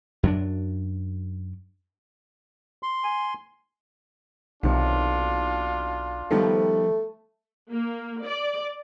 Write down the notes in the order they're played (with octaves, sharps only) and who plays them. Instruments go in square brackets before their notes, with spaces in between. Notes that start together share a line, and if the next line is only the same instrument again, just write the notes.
[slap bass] F#2 F#3 D4
[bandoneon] C6
[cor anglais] G#5
[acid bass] B1 [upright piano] C3 D#3 [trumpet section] D4 F4
[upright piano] D#3 G3 B3 [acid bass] F3 [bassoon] A3
[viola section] A#3
D5